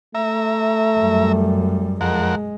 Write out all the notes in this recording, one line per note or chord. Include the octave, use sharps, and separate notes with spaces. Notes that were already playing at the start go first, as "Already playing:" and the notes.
A3 E5 A#5
F#2 G3
F2 G#3 A#4 F#5